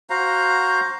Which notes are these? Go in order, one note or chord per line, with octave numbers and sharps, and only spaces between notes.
F#4 C5 F5 A#5